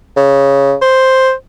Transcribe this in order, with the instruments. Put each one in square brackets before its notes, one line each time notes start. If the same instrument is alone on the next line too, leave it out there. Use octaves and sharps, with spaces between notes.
[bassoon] C#3
C5